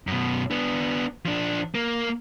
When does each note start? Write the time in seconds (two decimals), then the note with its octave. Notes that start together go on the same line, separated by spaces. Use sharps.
0.07 F#2 B2
0.51 B3 D4
1.26 F3 D4
1.75 A#3